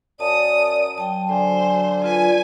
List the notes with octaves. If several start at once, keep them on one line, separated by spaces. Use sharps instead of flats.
F#2 D5 A5 D#6
F#3 G5 A5
D3 C5 G#5
F4 B4 D5 G#5